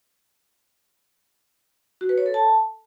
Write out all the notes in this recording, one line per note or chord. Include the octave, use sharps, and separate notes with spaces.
F#4
B4
C#5
A4
A5